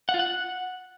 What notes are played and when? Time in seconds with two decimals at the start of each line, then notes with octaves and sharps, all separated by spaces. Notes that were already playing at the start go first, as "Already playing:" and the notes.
0.09 F#5
0.14 F4
0.19 F#5